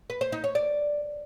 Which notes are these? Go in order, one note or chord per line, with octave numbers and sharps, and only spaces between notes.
B4
C5
D#4
C#5
D5